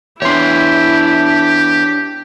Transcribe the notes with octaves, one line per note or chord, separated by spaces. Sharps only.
E2 D4 E4 G4 C#5 C6